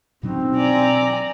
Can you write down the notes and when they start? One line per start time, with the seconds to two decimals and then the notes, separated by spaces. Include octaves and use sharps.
0.23 B2 F#3 C4 D4 D#4
0.56 D5 G#5 A#5